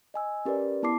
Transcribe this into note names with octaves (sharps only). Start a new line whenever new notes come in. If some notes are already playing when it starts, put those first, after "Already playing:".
D#5 G#5 E6
C#4 G4 A#4 B4 D5
B3 E4 A5 C6 D6 C7